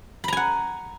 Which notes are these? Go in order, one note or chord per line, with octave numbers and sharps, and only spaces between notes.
F#5 G#5 A#5 B5